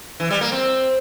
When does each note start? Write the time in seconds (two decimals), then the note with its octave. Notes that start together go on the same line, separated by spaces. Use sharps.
0.20 E3
0.30 G3
0.41 A#3
0.52 C4